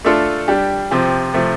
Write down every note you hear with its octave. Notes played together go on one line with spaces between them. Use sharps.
A3 D4 F4 A4
G3 D4 G4
C3 F3 C4 G4
C3 F3 A3